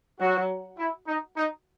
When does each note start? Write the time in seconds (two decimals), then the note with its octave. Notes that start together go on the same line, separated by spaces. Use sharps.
0.20 F#3 F#4
0.78 E4
1.07 D#4
1.37 D#4